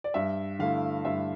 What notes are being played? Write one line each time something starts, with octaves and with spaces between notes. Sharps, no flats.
D5
G2 E5
D3 A3 E4 F5
G2 E5